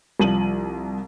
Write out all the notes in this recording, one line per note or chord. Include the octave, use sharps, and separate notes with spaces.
C2 F3 D#7 F#7